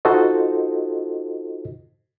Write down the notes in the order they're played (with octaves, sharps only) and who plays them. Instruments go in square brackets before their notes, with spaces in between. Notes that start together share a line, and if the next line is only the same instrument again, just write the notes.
[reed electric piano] D#4 F4 F#4 A4 C5 D#5